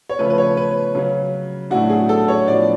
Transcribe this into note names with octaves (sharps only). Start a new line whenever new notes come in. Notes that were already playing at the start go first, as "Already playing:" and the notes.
C#5
C#3 F3 A3 C#4 B4
B4
C#5
B4
C#3 F#3 C#4
A2 F#3 A3 D4 F#4
G#4
A4
C#5
A2 F3 B3 D4 D5